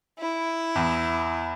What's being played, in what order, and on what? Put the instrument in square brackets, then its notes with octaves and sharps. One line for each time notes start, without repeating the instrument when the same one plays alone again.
[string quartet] E4
[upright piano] E2